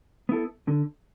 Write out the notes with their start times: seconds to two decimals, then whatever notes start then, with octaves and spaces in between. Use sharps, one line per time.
0.29 B3 E4 A4
0.68 D3